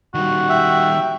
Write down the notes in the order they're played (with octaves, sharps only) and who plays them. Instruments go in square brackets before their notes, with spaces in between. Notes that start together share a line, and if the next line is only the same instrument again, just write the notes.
[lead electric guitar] D#3 G3 [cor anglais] F#4
[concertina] E5 [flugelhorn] G5